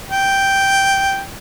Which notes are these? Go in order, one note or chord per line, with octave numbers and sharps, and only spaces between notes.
G5